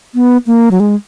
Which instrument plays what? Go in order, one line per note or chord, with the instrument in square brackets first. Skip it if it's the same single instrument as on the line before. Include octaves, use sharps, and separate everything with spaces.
[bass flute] B3
A#3
F#3
G#3